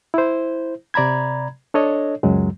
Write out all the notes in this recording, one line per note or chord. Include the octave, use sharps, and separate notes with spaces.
E4 C5
C3 D5 A#5 B5 G#6
D4 A4 C#5 D#5
C#2 F#2 F#3 G#3